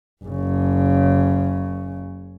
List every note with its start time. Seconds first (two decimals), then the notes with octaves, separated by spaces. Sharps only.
0.24 F#1 C#3